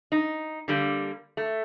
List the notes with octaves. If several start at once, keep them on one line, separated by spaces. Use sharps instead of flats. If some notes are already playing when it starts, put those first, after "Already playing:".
D#4
D3 G3 A#3
A3